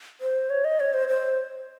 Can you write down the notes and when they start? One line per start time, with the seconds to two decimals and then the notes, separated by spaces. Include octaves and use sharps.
0.21 C5
0.50 C#5
0.65 D#5
0.80 C#5
0.94 C5
1.09 C5